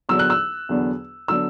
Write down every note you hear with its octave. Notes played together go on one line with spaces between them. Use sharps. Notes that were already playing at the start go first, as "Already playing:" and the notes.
E2 D3 F#3 B3 D4 E6
F#6
E6
E2 D3 F#3 B3 D4
D3 F#3 B3 D4 E6